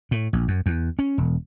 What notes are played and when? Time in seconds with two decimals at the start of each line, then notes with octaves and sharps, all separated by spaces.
0.11 A2
0.33 A#1
0.48 F#2
0.66 E2
0.99 C#4
1.18 E1